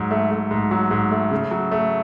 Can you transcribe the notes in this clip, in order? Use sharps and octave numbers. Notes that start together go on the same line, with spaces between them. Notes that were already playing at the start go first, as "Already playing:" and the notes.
Already playing: G#2 F#3
A3
A3
G#2
F#3
G#2
A3
C#3
F#3
A3